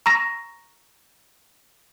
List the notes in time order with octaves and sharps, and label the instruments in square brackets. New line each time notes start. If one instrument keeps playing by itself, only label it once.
[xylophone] A#5 C#6 A#6